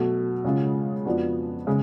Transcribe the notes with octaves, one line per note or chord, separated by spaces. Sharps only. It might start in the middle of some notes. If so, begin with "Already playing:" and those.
Already playing: B2 F#3 A3
C#3 G#3 C#4 F4
F2 F3 B3 D4 F#4
C#3 G#3